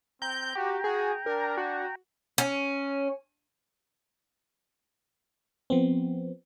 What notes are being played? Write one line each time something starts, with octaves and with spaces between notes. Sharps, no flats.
C4 G5 A#5 G6
F#4 G4
F#4 G#4
D4 A#4
F#4
C#4
F3 B3 C4